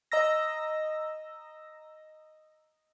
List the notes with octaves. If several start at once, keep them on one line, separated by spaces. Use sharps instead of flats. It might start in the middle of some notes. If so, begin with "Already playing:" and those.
D#5 A#5 E6 A#6